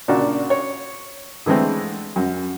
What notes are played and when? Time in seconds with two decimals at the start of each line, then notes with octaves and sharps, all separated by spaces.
0.08 A#2 C#3 D4 F#4
0.50 C#5
1.46 D3 E3 G#3 A3 C4
2.16 F#2